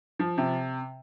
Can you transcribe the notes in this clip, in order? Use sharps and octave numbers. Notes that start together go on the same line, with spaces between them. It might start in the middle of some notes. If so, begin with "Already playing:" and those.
F3
C3